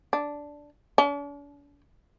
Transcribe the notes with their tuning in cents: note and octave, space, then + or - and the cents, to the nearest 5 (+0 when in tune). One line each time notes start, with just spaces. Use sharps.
D4 -5
D4 -45